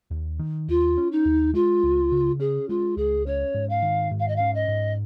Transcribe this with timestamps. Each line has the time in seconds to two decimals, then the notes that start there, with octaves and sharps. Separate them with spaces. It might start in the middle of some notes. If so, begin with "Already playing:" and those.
0.11 D#2
0.39 D#3
0.68 D#2 F4
0.97 C#4
1.11 D#4
1.26 D#2
1.54 G#3 F4
1.83 C#2
2.12 C#3
2.40 C#4 G#4
2.69 G#3 F4
2.97 C#2 G#4
3.26 C#4 C#5
3.54 G#2
3.69 F5
3.82 D#3
4.11 G#2
4.19 F5
4.28 D#5
4.36 C#4 F5
4.54 D#5
4.68 G#2